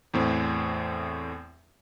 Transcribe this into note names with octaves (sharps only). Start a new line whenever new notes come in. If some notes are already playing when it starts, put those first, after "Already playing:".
E2 A2 C4